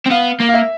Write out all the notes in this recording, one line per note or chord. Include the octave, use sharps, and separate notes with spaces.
C4
B3 F5
A#3
F5
E5